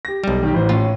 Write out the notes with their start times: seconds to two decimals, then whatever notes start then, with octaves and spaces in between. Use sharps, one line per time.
0.05 G4 A#6
0.24 B1 G3
0.43 D#3 G4
0.54 A1 E3 C5
0.69 A2 C#4 F4